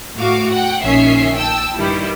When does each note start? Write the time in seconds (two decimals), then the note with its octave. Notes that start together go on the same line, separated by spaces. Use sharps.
0.17 A2 F#4 F5 D6
0.50 F#5 G5
0.83 A#1 D#3 C#4 E5 C7
1.37 G5 A5 E6
1.76 G2 D#3 G3 E4